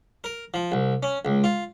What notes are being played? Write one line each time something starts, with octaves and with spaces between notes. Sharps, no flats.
A#4
F3
C2
C#4
C#2
F4